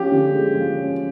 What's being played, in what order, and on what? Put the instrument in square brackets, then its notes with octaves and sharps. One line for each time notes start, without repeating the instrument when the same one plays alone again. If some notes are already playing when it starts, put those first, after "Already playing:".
Already playing: [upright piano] F3 C#4 [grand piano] G4
[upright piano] D3
G#3
F3
C#4